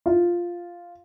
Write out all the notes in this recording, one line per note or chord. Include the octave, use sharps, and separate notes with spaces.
F4